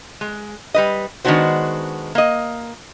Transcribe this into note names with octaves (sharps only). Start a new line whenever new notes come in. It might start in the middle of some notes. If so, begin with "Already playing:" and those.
G#3
G3 B4 D#5
D#3 G#3 B3 D4 F#4 C5
A#3 D#5